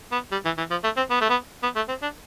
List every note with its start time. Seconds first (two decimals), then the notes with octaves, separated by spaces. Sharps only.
0.12 B3
0.32 G3
0.45 E3
0.58 E3
0.71 F3
0.84 A3
0.97 C4
1.11 B3
1.21 A3
1.30 B3
1.63 B3
1.76 A3
1.89 C4
2.02 D4